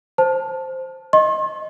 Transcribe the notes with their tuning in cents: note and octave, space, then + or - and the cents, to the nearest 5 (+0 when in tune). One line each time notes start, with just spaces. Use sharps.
C5 +0 A5 +0
D#5 +0 C6 +45